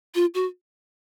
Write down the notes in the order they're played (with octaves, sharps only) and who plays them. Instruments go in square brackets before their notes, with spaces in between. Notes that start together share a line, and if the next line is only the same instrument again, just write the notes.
[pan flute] F4
F#4